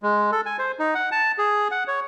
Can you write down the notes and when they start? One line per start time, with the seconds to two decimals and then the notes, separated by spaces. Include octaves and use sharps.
0.03 G#3
0.32 A4
0.46 G#5
0.59 C5
0.79 D#4
0.95 F#5
1.12 A5
1.38 G#4
1.71 F#5
1.88 C#5